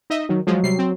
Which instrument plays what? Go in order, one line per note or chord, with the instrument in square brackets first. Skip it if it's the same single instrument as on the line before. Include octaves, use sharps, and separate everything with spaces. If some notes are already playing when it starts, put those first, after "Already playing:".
[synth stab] D#4 D#5 E5
[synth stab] D#3 [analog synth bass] F#3
[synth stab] F3 G#3 [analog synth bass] F#3
[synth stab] C3 G3 C7
C4